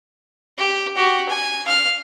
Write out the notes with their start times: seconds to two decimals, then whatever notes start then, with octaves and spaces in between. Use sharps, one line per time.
0.58 G4
0.96 F#4 G4
1.29 G#5
1.65 F5 F6